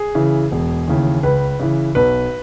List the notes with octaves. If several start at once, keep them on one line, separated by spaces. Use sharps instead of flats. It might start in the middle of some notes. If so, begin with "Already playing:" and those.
Already playing: G#4
C#3 E3
E1
D#2 C#3 E3
C#2 B4
C#3 E3
B1 B4